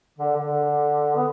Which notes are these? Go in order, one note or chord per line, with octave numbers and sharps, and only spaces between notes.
D3
D3
B3